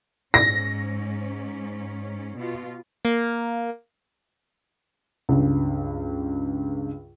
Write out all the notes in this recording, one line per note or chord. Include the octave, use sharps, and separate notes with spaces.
G#2 C#4 A#6
B2 F4
A#3
C#2 G2